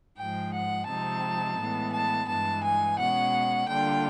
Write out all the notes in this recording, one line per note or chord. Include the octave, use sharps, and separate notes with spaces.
G#2 F3 G#3 G5
F#5
C3 F3 G#3 C4 D#4 A5
A2 E3 G#3 B3
A5
G2 E3 G#3 A5
G#5
B2 G#3 C#4 F#5
D3 G3 A#3 D4 F4 G5